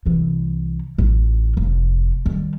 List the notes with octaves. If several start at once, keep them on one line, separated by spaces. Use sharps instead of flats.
C2 E3
A1 F4
F1
D#3 G3